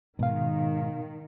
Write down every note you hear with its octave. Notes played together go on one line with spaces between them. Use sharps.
G#2 B2 D#3 F5